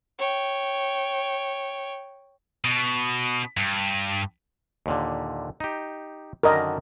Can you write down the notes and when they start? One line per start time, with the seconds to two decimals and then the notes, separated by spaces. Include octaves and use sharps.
0.19 C#5 G5
2.64 B2
3.57 G2
4.86 D#2 A#2 D3
5.60 D#4 G4
6.43 F#2 D3 D#3 A#4 D#5